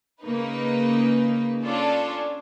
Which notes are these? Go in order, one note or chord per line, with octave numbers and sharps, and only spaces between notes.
C#3 A#3 D#4 B4
C#4 D4 F4 A4